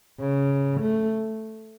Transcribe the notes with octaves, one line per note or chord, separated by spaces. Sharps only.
C#3
A3